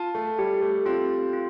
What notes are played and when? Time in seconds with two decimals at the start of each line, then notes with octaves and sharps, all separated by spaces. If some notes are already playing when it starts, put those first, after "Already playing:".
Already playing: F4 A5
0.15 A3
0.38 G3 G4
0.62 A3
0.86 C4 F4
1.33 F4